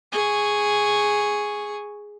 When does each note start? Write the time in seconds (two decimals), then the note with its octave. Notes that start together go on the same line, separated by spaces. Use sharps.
0.12 G#4 C#6